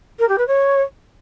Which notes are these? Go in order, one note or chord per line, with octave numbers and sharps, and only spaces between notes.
A#4
G4
B4
C#5